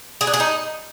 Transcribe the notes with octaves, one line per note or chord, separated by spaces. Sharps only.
G#4
D4
G#4
D#4